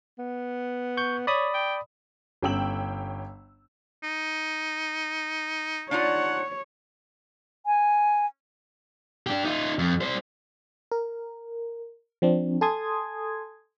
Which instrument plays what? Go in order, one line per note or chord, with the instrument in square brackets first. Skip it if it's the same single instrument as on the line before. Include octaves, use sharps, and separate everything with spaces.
[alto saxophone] B3
[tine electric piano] C#6 G6
[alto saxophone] C#5 [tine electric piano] D5 B5 D#6
[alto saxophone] G5
[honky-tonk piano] G1 C#4 G5 E6 F#7
[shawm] D#4
[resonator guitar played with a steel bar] D4 D#4 F4 [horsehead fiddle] C#5 [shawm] F#5
[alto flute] G#5
[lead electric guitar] D4 G4
D#4 F4
F2
G3 C5
[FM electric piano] A#4
F3 C4 D4
A4 G#5 A5 C6 D#6 G#6